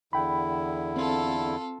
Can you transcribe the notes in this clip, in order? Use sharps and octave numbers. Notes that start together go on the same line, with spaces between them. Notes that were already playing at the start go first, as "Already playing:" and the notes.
E2 D3 E4 G5 B5
C4 F4 A4